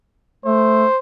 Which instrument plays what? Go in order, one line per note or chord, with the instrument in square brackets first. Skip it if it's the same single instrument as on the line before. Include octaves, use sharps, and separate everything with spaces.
[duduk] A3 [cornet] C5